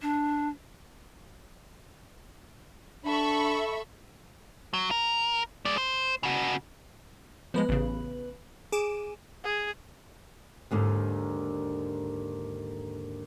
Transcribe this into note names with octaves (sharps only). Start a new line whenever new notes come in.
D4
D4 A4 E5 B5 C#6
F#3
A#4
G#3 D5
C5
C#3 F#4
F3 G#3 B3 B4
A1 C#3
G#4 D6 D7 E7
G#4
D#2 G#2 D3 D#3